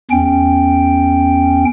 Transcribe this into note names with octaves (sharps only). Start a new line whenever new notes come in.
E2 C#4 G5